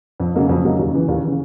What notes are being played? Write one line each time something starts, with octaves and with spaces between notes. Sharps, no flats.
F2
C#3 F#3 A#3 D#4
F2
C#3 F#3 A#3 D#4
D#2
C#3 E3
D#2
C#3 E3